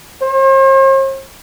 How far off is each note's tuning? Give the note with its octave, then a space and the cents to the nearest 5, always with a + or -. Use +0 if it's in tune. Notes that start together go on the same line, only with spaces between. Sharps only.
C5 +45